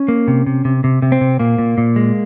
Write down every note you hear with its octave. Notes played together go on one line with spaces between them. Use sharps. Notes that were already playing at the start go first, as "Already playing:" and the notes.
Already playing: C#4
A#3
C3
C3
C3
C3
C3
C4
C3
A#2 A#3
A#2
A#2
G#3